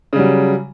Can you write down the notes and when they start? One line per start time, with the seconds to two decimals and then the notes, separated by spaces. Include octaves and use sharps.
0.13 C#3
0.16 G3
0.19 F#3